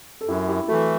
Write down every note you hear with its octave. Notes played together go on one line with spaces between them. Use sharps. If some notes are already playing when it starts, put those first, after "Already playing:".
A4
F#2 E4 G4
E4 G4
E3 A3 F#4 A4